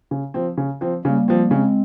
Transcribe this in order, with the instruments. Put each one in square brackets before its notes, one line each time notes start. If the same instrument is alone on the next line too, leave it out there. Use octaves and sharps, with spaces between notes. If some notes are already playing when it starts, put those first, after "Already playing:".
[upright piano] C#3
F3 C4
C#3
F3 C4
[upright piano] C#3 [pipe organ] G3 A#3
[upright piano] F3 C4
[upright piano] C#3 [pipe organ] G#3 C4